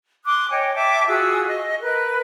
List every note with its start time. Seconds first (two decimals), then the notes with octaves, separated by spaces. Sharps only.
0.24 C6 D6 D#6 F#6
0.49 C#5 D#5 G5 G#5
0.74 E5 G5 A5 D6
1.07 F4 F#4 G#4 E6
1.47 D#5
1.81 A#4 B4 F#6